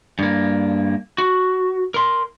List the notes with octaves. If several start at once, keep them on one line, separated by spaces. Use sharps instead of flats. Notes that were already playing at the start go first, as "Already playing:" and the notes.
G2 A#3
F#4
A#4 C6